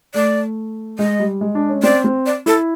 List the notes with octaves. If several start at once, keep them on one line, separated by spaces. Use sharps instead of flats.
A3 D5
G#3 D#5
G3
G#3
D4
C#4
C4 D5
C4
D5
E4 A4